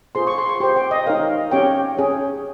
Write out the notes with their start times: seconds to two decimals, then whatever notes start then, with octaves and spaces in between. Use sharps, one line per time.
0.15 F4 G#4 C5 C6
0.27 C#6
0.38 C6
0.49 C#6
0.60 G4 C5 C6
0.76 G5
0.91 D#5
1.07 D#4 A#4 C#5 F5
1.52 C#4 G4 C#5 G5
1.97 C#4 G#4 C#5